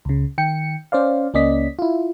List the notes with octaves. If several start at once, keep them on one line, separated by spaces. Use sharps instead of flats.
C#2 C#3
D#3 G5 C#7
C#4 C5 D5 F5
C#2 A#3 C#4 D5 D#5 B6
E4 F4